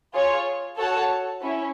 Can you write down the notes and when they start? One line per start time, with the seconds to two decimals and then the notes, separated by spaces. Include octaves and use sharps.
0.14 F4 G#4 C#5
0.77 F#4 A4 C#5 F#5 A5
1.41 C#4 E4